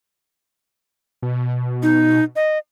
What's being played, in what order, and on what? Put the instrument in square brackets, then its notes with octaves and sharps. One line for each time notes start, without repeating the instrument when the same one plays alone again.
[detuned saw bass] B2
[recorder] D#4
D#5